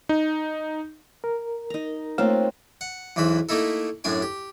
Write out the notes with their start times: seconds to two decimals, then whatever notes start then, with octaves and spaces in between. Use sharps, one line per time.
0.09 D#4
1.24 A#4
1.70 D#4 A#5
2.18 A3 A#3 C4 F4 C5 C#5
2.81 F#5
3.16 B1 E2 E3 C5 B5
3.49 A3 A#3 D#4 E4 A4
4.04 F#2 A2 D4 D5 G#5
4.22 G4